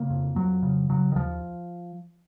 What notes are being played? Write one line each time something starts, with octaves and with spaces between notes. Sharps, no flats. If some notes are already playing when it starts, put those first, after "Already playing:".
Already playing: C#3 A#3
F2
F2 F#3
C#3
C#3 F#3
D#3
D#2 F3